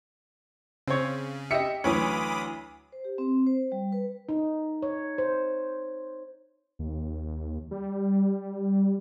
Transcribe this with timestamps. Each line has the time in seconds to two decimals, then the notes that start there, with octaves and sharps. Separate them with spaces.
0.88 C#3 C4 C#5
1.51 G4 D#5 E5 C#7
1.84 D2 E3 F#3 C#4 B5 D6 D#6
2.93 C5
3.05 G4
3.18 C4
3.47 C5
3.72 G3
3.92 B4
4.29 D#4
4.82 C#5
5.18 C5
6.79 D#2
7.71 G3